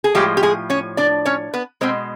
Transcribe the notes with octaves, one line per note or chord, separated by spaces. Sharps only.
G#4
A2 F3 G3 G#3 G4
G4
G#3 G#4
C#4 C#5
D4 D5
C#4 C#5
B3 B4
B2 G#3 C4 C5